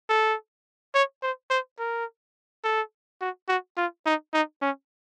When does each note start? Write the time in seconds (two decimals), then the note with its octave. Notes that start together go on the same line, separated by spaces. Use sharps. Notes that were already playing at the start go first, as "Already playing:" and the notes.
0.09 A4
0.94 C#5
1.22 C5
1.50 C5
1.79 A#4
2.64 A4
3.21 F#4
3.48 F#4
3.77 F4
4.06 D#4
4.33 D#4
4.62 C#4